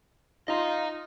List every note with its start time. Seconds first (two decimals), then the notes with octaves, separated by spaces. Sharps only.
0.48 D#4 F4 D#5 A#5 C6